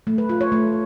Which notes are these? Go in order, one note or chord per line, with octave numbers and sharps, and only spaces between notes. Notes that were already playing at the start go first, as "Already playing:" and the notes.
A3
B4
F4
C#5
A3